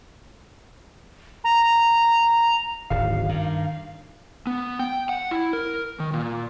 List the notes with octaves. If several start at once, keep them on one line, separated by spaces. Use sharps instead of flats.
A#5
D1 G#1 F5
G2 D#3
B3
G5
F#5
E4
A#4
D#3
A#2